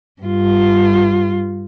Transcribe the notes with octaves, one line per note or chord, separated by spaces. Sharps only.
G2 F4